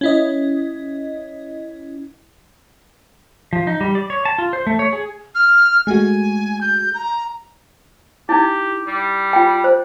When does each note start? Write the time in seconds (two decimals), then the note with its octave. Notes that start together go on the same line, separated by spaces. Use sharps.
0.01 C#4 E4 D#5
3.53 F3
3.67 D#4
3.81 G3
3.95 D5
4.10 C#5
4.25 A5
4.38 F4
4.53 C5
4.67 A3
4.79 C#5
4.93 G#4
5.35 F6
5.87 G#3 A3 F#4 G#5
6.61 G6
6.94 A#5
8.29 D#4 E4 G4
8.87 G3
9.33 F4 G5
9.64 C5